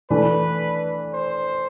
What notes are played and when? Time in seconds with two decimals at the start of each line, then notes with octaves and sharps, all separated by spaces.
0.10 E3 A3 D4 B4
1.14 C5